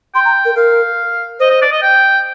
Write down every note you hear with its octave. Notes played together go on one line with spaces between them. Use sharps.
G5 C6
A#5
A#4
A#4 F5
C5 D#5
D#5
D5
D#5
G5